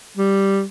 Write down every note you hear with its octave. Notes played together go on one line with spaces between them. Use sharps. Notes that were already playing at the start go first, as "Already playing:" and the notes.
G3